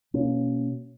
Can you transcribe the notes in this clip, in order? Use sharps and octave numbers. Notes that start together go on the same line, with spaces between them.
B2 A#3 C#4